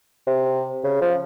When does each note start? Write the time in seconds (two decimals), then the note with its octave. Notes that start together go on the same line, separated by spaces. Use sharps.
0.27 C3
0.84 C#3
1.01 F3